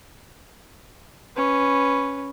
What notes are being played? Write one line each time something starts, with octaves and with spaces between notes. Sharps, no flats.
C#4 B4